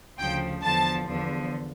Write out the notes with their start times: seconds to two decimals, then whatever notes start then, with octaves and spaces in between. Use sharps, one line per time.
0.19 D2 C#3 F3 G5
0.62 E2 D3 F3 A5
1.06 E2 D3 F3